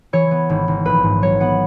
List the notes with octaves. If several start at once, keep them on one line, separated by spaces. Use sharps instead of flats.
E3 C#5
B3
G#1
G#1
A#1 B4
G#2
F#3 C#5
B3 F#5